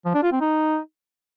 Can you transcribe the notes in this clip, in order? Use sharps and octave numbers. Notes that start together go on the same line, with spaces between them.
F3
D4
F4
C4
D#4